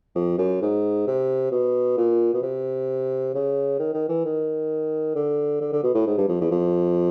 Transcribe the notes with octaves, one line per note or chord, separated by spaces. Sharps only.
F2
F#2
G#2
C3
B2
A#2
B2
C3
C#3
D#3
D#3
E3
D#3
D3
D3
D3
B2
A2
G#2
G2
F2
E2
F2